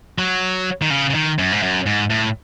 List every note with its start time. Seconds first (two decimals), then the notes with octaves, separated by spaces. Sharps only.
0.19 F#3
0.82 D#3
0.90 C#3
1.10 C#3
1.14 D#3
1.39 F#2
1.52 G#2
1.63 F#2
1.86 G#2
2.10 A2